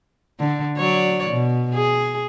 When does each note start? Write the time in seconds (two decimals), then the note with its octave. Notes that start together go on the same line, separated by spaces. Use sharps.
0.40 D3
0.78 F#3 C#5 D5
1.30 B2
1.74 G#4